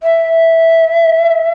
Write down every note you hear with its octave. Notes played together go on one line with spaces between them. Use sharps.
E5